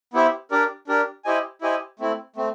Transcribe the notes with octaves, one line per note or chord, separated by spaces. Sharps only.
B3 E4 G4 C5 E5
D4 G4 A#4 D5
D4 G4 A#4 D5
E4 G4 C5 D#5 G#5
E4 G4 C5 D#5 G#5
A3 C4 E4
A3 C4